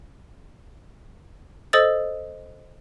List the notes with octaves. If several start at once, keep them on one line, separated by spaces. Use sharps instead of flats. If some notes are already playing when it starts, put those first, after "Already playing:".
A4 C5 D#5 D#6 E6 A6